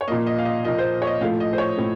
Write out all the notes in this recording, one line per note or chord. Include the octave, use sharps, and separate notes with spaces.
C#5
A#2 F3 A#3 D#5
D#5
F5
D#5
A#2 F3 A#3 D#5
C5
C#5
D#5
A2 F3 A3 F5
D#5
C5
C#5
A2 F3 A3